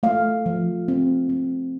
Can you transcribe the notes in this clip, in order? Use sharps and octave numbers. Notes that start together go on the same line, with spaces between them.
A3 F5
F3
C4
C4